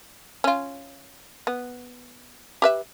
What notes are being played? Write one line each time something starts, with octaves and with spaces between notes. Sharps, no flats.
C#4 F4
B3
G4 B4 E5